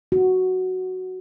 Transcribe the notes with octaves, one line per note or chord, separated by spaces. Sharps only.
F#4